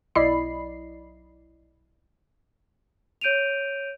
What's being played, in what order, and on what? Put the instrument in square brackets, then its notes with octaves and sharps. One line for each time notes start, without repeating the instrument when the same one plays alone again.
[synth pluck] B1 E4 D5 D#5 B5 C7
[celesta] C#5 G6 D7 D#7 F7